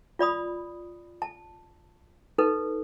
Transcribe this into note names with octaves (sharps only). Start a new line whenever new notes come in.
F4 D5 B5 D#6
A5
D#4 A4 B4